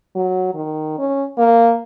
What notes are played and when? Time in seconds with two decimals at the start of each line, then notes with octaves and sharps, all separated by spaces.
0.15 F#3
0.54 D#3
0.98 C#4
1.38 A#3